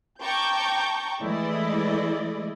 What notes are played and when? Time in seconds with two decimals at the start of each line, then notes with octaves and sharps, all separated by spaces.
0.22 G5 A5 A#5 C#6 D6 G6
1.21 E3 G#3 A3 E4 D5 D#5